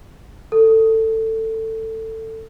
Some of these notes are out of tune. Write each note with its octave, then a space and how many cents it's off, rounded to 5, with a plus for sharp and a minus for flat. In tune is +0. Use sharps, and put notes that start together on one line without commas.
A4 +20